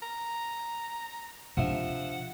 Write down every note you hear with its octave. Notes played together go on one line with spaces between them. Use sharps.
A#5
C3 F3 D4 E5 F#5